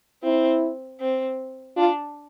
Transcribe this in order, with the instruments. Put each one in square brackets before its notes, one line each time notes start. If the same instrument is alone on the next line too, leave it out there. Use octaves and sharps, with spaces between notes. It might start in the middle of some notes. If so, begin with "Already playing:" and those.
[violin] C4 [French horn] E4
[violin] C4
[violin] D4 [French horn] F4